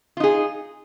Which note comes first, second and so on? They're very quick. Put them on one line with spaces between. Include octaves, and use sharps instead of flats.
F4 D#4 G#4